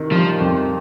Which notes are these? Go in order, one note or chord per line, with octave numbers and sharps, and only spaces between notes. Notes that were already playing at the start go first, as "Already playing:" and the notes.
Already playing: C3 D#3
F3 G3
F2